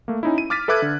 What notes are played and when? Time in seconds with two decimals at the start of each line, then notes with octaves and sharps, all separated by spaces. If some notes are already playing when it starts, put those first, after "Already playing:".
0.08 A3 A#3
0.23 C#4 D#4 E4
0.38 D#7
0.50 D6 F6 A6 B6 D#7
0.68 A4 B4 E5 D6 F#6 G#6
0.82 D3